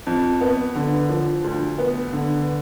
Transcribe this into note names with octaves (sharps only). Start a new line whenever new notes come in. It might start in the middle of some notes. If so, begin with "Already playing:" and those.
F2
B3
D3
F3
D2
B3
D3